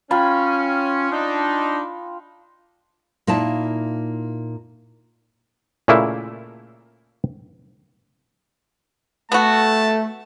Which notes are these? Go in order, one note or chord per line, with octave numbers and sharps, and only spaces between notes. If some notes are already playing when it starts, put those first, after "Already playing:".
C#4 F4 G5 B5
D4 D#4
A#2 A#3 D#4 E4 A5
A#2 C#3 A3 A#3 E4
A3 B3 F#4 A5